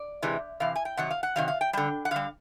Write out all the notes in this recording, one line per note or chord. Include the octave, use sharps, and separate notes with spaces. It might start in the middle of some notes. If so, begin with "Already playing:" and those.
Already playing: D5
C3 E3 G#3
C3 E3 F5
G#5
G5
C3 D#3 F#3 F#5
F5
F#5
C3 D#3 F#3 F5
F5
G5
D3 G3 G5
F#5
D3 G3 F5